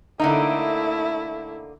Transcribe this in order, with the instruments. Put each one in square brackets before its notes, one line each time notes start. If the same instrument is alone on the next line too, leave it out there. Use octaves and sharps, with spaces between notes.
[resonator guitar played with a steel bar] D3 A#3 D#4 [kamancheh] A3 E4